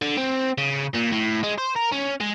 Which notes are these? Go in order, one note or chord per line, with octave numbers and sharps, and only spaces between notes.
D3
C4
C#3
A#2
A2
G#3
C5
A#4
C#4
G#3